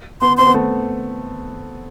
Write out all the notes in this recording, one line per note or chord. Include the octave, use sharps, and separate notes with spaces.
B3 C6
C4 C6
B3
A3